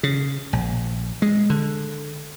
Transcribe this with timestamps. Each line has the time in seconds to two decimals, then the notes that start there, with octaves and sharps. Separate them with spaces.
0.03 C#3
0.53 A#1
1.22 G#3
1.50 D3